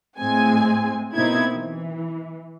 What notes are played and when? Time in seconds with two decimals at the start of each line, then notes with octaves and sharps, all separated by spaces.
0.18 A2 G#3 C4 G#5
1.15 B2 A#3 C4 D#4 E4 G#6
1.52 E3